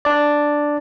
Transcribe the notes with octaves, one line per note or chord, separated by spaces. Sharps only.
D4 D5